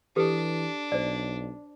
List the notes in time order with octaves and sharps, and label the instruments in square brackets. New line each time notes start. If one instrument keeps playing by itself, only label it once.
[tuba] E3 [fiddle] D4 [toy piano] G4 A4 B4
[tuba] B1 [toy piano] C5 D5